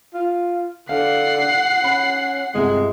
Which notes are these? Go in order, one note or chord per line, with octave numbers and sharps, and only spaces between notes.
F4
D3 F5 F#5 C7
C#4 B5
G1 C3 G#3 E5